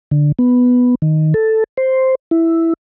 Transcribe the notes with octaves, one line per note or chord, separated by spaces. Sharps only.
D3
B3
D#3
A4
C5
E4